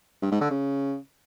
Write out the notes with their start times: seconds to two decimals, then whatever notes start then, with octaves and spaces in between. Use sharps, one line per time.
0.22 G2
0.31 G#2
0.41 D3
0.50 C#3